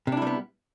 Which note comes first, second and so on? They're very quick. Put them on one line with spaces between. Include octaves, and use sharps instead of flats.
C3 D4 E4 G3 B3